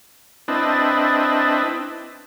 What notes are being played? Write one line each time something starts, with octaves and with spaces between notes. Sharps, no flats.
C4 D4 E4 B4 D#5 A5